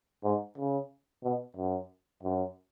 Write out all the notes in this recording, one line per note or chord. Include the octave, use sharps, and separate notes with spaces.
G#2
C#3
B2
F#2
F#2